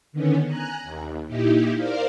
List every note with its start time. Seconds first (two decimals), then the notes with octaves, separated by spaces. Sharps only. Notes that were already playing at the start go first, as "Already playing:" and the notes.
0.12 D3 D#3 B3 C#4
0.47 G#5 A#5 F#6
0.83 D#2
1.27 A#2 D#4 E4 G4
1.77 A#4 C5 D5 F5